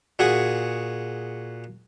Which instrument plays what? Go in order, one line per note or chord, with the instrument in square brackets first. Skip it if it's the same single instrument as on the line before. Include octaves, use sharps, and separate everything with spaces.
[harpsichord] A#2 F#4 G#4 F#5 C#6 D#6